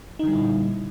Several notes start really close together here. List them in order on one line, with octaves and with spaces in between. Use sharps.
D#4 D3 G3 E4 A#2